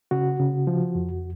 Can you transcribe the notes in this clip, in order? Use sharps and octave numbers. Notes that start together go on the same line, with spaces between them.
C#3 F#4
C#3
F3
F2